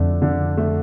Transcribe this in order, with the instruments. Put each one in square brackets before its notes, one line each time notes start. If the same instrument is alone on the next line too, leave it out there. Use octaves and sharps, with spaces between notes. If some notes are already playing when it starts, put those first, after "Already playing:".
Already playing: [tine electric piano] F2 [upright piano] D3 A3 D4
[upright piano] D3
A3